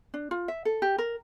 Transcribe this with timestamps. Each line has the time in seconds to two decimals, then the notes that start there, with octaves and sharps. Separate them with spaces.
0.14 D4
0.31 F4
0.48 E5
0.65 A4
0.82 G4
0.98 A#4